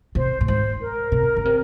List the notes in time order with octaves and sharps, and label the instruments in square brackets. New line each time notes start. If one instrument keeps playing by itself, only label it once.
[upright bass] C3 [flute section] C5
[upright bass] A#2
[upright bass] G#2 [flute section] C5
[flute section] A#4
[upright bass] C3
C#3
C3